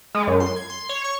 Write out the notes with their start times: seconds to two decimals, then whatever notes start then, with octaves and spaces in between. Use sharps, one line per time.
0.15 G#3
0.27 F#2
0.40 C6
0.56 G#6
0.70 C6
0.89 C#5
1.04 C#6